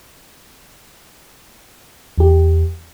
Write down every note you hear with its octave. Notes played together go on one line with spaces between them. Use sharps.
E2 G4